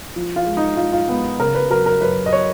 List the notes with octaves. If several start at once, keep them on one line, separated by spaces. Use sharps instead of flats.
F3
F4
G#3
D#4
G#2 F4
F4
G#2 B3
C#3 A#4
B4
F#3 A#4
A#4
F#2 B4
D#5
C#5